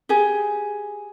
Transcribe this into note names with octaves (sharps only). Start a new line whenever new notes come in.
G4 G#4